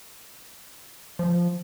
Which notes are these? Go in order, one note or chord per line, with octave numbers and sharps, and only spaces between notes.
F3